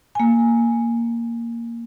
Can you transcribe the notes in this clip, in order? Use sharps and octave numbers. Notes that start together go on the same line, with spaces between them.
A#3 G#5